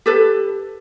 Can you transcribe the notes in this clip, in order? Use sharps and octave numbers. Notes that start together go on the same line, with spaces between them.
G4 A4 B4